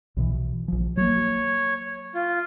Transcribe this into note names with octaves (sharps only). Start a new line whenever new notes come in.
B1 B2 E3
A#1 F3
F#3 A#3 C#5
F4